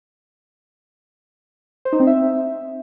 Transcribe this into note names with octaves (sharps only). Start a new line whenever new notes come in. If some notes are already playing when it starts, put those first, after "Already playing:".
C5
D#4
C4
E5